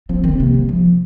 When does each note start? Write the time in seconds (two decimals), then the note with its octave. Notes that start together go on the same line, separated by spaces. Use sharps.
0.09 F3 C4
0.24 D#3 C4
0.39 C3 A#3
0.54 G3
0.69 F3